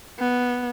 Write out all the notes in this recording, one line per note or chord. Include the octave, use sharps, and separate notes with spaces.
B3